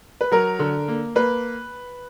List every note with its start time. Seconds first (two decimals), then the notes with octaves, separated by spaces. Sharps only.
0.21 B4
0.32 F#3 A#4
0.59 D3
0.88 A#3
1.15 A#3 B4